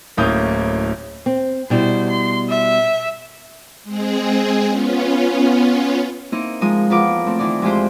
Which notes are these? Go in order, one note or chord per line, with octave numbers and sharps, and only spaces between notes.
D1 A2 A#3 C#4 D#6 G6
C4
B2 G3 E4 C5
C6
E5
G#3 C4 G#4
B3 C#4 F4
A#3 C4 D#4 E4 D#5
F3 G#3 A#4 D#6
E2 F3 A#4 B4 F5 D6
A3 C4
D#3 E3 D#4 D5
F2 E3 G#3 F4 G4 C5